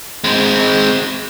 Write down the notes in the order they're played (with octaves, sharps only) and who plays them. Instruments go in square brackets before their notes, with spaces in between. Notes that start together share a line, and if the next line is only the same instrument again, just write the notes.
[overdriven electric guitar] G#3 C4